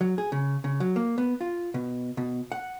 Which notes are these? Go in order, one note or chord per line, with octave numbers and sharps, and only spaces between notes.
F#3
G#4
C#3
C#3
F#3
A#3
B3
F4
B2
B2
F#5